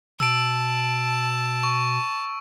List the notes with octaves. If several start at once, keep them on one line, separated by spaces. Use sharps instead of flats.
B2 A5 E6 D7
C#6